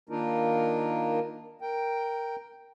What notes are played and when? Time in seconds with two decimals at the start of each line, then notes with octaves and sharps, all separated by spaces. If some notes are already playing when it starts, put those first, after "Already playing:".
0.09 D#3 A#3 D4 D#4 F4 A#4
1.61 A#4 G5